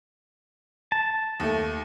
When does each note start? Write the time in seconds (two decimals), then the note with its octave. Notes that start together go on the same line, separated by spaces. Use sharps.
0.92 A5
1.40 D#2 A3